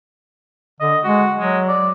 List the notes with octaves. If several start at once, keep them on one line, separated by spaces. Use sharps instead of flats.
D3 D#5
G#3 F#4
F#3 G#3
D5